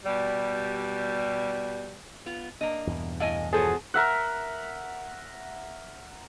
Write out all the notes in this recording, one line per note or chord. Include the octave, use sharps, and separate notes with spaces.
B2 G3
B3 F4
A#3 D4 D#5
E2 G2 B2
A2 E4 D#5 F5 G#5
F3 B3 F#4 G#4 A4 C5 C#5
A#4 E5 F#5